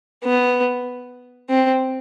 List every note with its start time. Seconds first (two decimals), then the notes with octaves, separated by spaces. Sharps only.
0.24 B3
1.50 C4